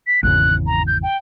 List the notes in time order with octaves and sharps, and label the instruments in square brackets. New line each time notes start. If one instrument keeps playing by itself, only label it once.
[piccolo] B6
[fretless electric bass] G#1 E2 C#3 [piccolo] F#6
[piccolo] A#5
G6
G5